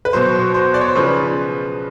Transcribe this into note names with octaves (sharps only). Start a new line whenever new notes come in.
B4
B2 F#3 C5
C5
D5
C#5
C5
C#3 F3 B4